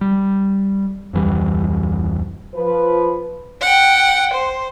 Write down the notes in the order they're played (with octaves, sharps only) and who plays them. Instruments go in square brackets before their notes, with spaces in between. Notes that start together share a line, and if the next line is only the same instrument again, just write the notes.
[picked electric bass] G3
D1 F2 E3 G3
[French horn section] F3 B4
[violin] F#5 G5
C5